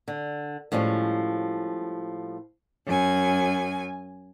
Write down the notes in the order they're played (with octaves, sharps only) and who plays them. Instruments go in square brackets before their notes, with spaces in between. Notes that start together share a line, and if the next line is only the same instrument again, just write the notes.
[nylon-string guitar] D3
A2 F3 G3 G#3 C#4
[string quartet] F#2 G#5